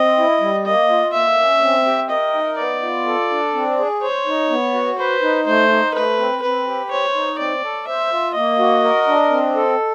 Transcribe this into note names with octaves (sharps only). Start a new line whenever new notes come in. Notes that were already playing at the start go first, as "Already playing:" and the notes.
Already playing: C4 D#5
E4
G3
A#3 D#5
F4
A#3 E5
C#4
C4
G4
A#4 D#5
D#4
B3 D5
F4
A4
D4
C4
G#4
C5 C#5
D#4
B3
F#4
B4 C5
D#4
A3 C5
D#4
A3 B4
C4
C4 B4
G4
C5 C#5
D#4
C4 D5
A4
C5 E5
F4
A#3 D#5
F#4
A#4
D4
C4
A4